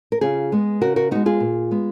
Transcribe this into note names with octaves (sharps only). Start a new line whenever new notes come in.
A#4
C#3 F4 G#4
G#3 B3
C#3 F#4 A#4
F#4 A#4
G#3 B3 D#4 F#4
F4 G#4
A#2
G#3 B3